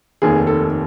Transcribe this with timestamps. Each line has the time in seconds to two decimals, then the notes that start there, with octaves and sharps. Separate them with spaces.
0.22 F1 D#2 D#3 G#4
0.47 A4